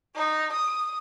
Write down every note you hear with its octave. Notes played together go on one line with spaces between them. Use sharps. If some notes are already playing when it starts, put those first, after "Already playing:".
D#4
D#6